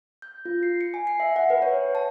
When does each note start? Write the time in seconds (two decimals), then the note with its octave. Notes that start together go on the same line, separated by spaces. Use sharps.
0.22 G6
0.45 F4
0.63 C7
0.81 C#7
0.94 G#5
1.07 C7
1.20 E5
1.36 F#5
1.50 B4
1.62 C#5
1.95 A5